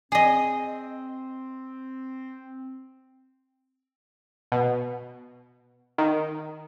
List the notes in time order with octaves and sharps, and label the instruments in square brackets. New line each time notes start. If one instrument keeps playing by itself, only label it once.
[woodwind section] C4 [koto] G#4 D#5
[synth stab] B2
D#3